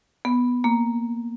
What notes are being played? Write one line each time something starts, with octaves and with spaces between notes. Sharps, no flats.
B3
A#3